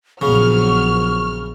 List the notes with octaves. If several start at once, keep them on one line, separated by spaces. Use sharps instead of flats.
A#1 C#3 F#3 B3 C#6 F6